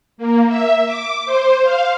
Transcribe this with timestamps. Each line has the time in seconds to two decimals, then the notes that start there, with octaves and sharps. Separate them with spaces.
0.18 A#3
0.48 E5
0.86 D6
1.25 C5
1.63 F5